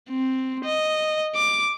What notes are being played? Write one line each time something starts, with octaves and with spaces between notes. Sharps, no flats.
C4
D#5
D6